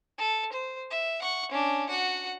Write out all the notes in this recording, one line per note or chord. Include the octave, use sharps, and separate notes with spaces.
A4
C5
E5
F#5 C#6
C#4 D4
F#4 F#5